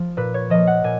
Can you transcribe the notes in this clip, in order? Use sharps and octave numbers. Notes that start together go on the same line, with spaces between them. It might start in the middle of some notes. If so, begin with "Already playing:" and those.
Already playing: F3
A#2 B4
C#5
F3 A#3 D#5
F#5
A#2 G#5